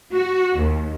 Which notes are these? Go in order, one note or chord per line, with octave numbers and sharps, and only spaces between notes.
F#4
D#2